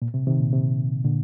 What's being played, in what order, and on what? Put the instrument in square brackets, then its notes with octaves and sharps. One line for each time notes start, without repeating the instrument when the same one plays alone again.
[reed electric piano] A#2
C3
C3 D#3
A#2
C3
A#2 D3